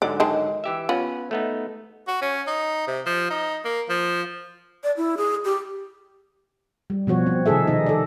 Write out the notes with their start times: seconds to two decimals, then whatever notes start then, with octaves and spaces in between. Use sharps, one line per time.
0.02 G#2 D3 F#3 D5
0.20 D#3 G#3 A5
0.64 E3 G4 E5
0.89 B3 C#4 F4 B4
1.31 A3 B3 D#4
2.07 F#4
2.22 C#4
2.47 D#4
2.87 C3
3.06 F3
3.30 D#4
3.65 A#3
3.89 F3
4.84 D5
4.97 E4
5.17 G#4
5.45 G4
6.90 G3
7.07 B2 F3 F#4 C#5
7.26 C4
7.46 C3 D#3 D#4 G#4 A4 E5
7.67 D#3 D#4 D#5
7.86 A4 D5